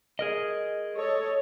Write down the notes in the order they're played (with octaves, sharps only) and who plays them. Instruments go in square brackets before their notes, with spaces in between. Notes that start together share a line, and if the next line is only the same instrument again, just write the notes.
[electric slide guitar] G#4 A#4 D#5
[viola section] A4 C#5 D#5